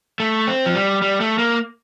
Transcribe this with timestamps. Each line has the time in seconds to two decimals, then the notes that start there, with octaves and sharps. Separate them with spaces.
0.20 A3
0.47 C4
0.66 F3
0.75 G3
1.02 G3
1.20 A3
1.39 A#3